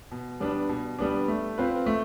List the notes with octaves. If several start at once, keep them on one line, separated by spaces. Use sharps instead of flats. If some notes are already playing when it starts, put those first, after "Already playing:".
B2
G3 B3 D4
B2
G3 B3 D4
A3
C4 F4 B4
A3